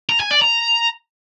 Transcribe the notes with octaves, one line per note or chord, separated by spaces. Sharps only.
A#5
G#5
D5
A#5